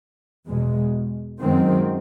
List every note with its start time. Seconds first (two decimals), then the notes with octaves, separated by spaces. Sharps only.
0.46 E2 B2 G#3
1.40 F#2 D#3 G#3 C4